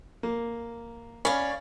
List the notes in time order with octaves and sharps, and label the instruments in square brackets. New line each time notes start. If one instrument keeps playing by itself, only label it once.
[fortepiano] A#3
[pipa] C#4 [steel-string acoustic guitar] D5 F5 [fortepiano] B5